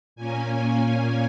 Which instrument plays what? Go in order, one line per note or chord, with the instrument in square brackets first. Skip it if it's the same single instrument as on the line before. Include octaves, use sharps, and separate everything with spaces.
[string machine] A#2 A#3 C#4 G#5